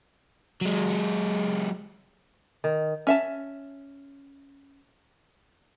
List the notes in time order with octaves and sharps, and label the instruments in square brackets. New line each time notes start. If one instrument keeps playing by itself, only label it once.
[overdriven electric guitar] F#3 G#3
[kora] D#3
[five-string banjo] C#4 E5 A5